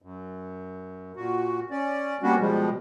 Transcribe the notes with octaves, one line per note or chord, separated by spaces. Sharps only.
F#2
A#2 F#4
C#4 D5
G3 A#3 B3 C#4 D4 F#4
B2 F3 G3 G#3